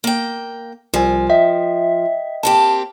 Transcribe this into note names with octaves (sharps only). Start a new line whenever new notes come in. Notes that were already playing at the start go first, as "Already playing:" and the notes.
A#3 G5
C2 F3 G3 G#5
D#5 E5 G5
A#3 C4 G4 A5